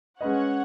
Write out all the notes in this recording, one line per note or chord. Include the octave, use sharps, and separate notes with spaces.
G#3 C#4 B4 C#5 D#5 F#5